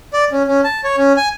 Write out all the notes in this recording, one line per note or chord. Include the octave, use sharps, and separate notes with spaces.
D5
C#4
C#4
A5
C#5
C#4
G#5